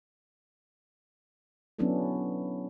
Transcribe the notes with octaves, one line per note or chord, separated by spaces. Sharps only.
F#3 B3 C#4 D4 E4 A4